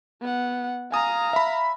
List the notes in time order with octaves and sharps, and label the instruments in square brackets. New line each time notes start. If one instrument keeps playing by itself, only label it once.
[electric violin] B3 F#5
[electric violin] F5 A#5 [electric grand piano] G#5 D#6
[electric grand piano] E5 B5